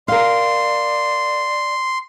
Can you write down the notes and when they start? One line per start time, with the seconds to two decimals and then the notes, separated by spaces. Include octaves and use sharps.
0.08 A#4 D5 F5 C6